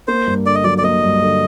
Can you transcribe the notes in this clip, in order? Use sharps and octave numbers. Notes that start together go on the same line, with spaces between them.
A#3 C5
G2
D3 D5
D#5
F#3 D5
D5
A#3 D#5
G2
D3